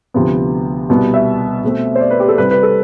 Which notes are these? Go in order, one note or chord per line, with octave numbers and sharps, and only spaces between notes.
D2 C3 F3 B3
C2 B2 G3 B3
E5
B2 A3 C4
C5
D5
B4
G4
A4
C2 C3 G3 C4 B4
B4
A4